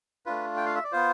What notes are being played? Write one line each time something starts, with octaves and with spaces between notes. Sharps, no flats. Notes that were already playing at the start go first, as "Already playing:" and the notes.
A3 D4 F4 B4
G5
F5
E5
D5
B3 F4 C5